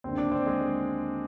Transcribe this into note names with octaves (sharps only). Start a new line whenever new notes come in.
D#2 D3 C4
D4
C4
G#3